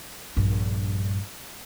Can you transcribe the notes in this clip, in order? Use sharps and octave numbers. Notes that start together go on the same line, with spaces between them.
A#1 G2